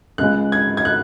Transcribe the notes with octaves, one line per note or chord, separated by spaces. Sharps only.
C#2 C#3 G#3 F#6
G#6
G#6
F#6